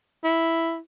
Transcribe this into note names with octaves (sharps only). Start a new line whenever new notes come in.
E4